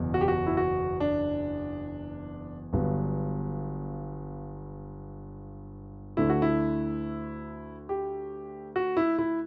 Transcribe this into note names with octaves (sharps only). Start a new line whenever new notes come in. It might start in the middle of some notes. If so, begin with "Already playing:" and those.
Already playing: F#1 E2 B2
F#4
G4
F#4
E4
F#4
D4
G1 G2 F#3 B3
D2 D3 A3 E4
F#4
E4
G4
F#4
E4
E4